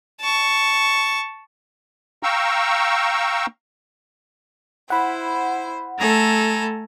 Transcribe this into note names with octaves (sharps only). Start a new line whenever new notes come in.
A5 C#6
F5 G5 A#5 C#6 E6
E4 C5 F#5 B5
A3 A4 G#5 A#5